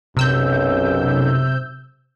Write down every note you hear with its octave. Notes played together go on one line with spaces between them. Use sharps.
B1 F#2 C3 E6 G6